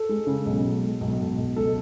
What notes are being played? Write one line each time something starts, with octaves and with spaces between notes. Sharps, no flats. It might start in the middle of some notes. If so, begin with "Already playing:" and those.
Already playing: A4
G#3
C#3
B1
G#3
G#3
B1
B1
B1
C#2 A4